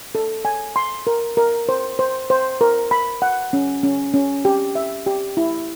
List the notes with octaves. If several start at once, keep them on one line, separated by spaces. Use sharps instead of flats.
A4
G#5
C6
A#4
A#4
C5
C5
C5
A#4
B5
F#5
C#4
C#4
C#4
G4
E5
G4
E4